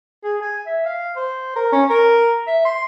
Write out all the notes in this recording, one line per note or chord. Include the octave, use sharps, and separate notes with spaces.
G#4
G#5
E5
F5
C5
A#4
C#4
A#4
E5
C6